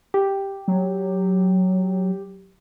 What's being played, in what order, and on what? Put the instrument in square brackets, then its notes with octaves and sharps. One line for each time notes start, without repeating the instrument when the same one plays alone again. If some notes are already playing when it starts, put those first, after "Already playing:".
[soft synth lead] G4
[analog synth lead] F#3